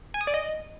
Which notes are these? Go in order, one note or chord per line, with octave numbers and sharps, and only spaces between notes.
G#5
D#6
D5
D#5